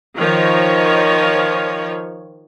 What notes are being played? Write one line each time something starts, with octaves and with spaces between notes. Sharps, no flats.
D#3 F3 C#5